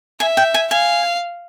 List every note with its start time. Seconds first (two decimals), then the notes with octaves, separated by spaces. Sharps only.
0.20 E5 G#5
0.37 G5
0.54 G#5
0.71 F5 G#5